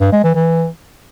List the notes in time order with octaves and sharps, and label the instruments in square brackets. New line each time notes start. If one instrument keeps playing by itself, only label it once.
[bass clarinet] G2
G#3
E3
E3